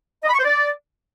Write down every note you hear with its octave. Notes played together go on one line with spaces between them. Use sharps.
D#5
B5
C#6
C5
D5